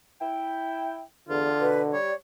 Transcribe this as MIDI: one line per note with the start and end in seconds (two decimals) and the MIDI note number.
0.21 1.01 64
0.21 1.01 79
1.29 1.50 40
1.29 1.94 50
1.29 1.71 65
1.61 1.91 47
1.61 1.82 71
1.93 2.11 55
1.93 2.13 73
1.93 2.14 74